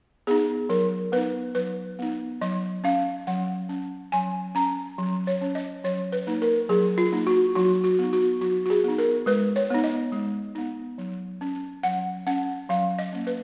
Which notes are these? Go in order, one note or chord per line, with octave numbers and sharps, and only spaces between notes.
B3 D#4 G#4
F#3 A#4
B3 D#4 B4
F#3 B4
B3 D#4
F#3 D#5
C#4 F5
F#3 F#5
C#4
F#3 G#5
C#4 A#5
F#3
C#5
C#4
D#5
F#3 C#5
B4
A#3 D#4
A#4
F#3 G#4
F4
A#3 D#4
F#4
F#3 F#4
F#4
B3 D#4
F#4
F#3 F#4
F#4
G#4
B3 D#4
A#4
G#3 B4
C#5
B3 D#4
D#5
G#3
B3 D#4
F#3
C#4
F#3 F#5
C#4 F#5
F#3 F5
D#5
A#3 C#4
B4